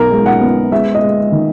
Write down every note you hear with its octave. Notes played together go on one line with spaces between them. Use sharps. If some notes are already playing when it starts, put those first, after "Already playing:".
Already playing: B1 A#4
G#3
F#5
B3
G#3 E5
D#5
G#3
D#3